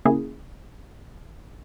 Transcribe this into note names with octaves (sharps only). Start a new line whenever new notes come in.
C#3 A#3 E4 G#4